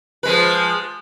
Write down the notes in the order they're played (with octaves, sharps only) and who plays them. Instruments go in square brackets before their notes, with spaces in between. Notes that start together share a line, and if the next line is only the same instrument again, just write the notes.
[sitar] F3 G#3 B4